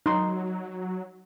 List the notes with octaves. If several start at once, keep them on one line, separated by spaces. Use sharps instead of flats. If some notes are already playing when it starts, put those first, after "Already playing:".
F#3 D#4 C6